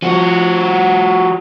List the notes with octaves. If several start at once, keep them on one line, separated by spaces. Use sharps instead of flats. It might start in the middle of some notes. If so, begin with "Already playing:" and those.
F3 F#4